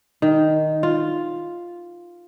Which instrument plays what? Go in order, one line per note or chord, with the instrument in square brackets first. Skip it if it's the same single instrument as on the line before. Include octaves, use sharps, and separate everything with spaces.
[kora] D#3
F4